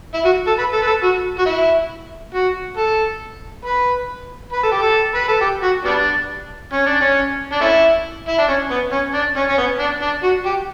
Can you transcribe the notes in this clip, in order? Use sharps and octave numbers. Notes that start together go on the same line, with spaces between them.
E4
F#4
A4
B4
A4
B4
A4
F#4
F#4
E4
F#4
A4
B4
B4
A4
G4
A4
B4
A4
G4
F#4
G3 B3 D4
C#4
D4
C#4
D4
A3 C#4 E4
E4
D4
C#4
B3
C#4
D4
C#4
C#4
B3
D4
D4
F#4
G4